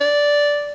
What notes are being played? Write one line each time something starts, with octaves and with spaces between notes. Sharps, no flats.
D5